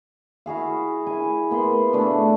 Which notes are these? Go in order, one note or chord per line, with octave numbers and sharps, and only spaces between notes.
E4 F#4 G#4 F5
E4 G#5
A#3 B3 B5 C6
B2 A3 D4 B4